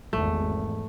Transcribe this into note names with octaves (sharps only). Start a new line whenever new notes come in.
G#1 E2 A3